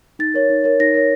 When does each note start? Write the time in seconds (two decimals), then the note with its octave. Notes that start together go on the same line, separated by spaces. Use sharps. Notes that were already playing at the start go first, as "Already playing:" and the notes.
0.19 D#4 A6
0.34 A#4 C#5
0.50 D#4
0.64 A#4 C#5
0.80 D#4 A#6
0.94 A#4 C#5